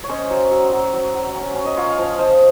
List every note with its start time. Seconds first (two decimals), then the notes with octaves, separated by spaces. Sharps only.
0.04 C#5
0.09 C#4 C5 D#5
0.30 F#3
0.51 F#3
0.72 F#3
0.93 F#3
1.14 F#3
1.35 C#4
1.56 C#4
1.65 D#5
1.77 F4 C#5 F5
1.98 F3
2.19 F3 C5 D#5